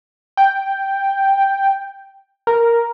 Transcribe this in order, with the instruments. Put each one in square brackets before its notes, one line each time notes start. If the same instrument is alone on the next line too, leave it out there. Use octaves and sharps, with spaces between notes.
[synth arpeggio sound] G5
A#4